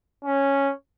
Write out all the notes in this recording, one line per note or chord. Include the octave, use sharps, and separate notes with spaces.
C#4